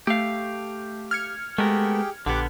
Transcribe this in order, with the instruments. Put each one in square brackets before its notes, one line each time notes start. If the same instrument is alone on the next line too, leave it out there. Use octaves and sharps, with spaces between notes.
[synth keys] A3 [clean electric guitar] G4 F5
[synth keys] F6 G#6 C#7
[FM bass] G#3 [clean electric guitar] A3 B3 A#4 [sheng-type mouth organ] G4 G#4 G5
[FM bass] A#1 [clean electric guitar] D3 B3 [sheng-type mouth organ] G4 F#5 D6